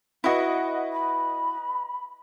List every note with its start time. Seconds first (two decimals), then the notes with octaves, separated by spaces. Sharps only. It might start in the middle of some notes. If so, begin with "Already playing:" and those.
0.24 E4 F#4 B4 D#5 F#5
0.92 B5